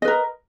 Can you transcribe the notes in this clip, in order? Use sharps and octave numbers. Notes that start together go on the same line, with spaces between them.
A#4 B4 D#5